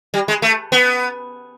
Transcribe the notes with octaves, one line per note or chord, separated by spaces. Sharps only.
G3
G#3
A3
B3